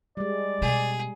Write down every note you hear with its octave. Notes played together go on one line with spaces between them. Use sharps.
G3 G#3 D5
B2 G#4